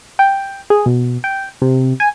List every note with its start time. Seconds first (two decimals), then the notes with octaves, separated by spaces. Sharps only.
0.19 G5
0.70 G#4
0.86 B2
1.24 G5
1.62 C3
2.00 G#5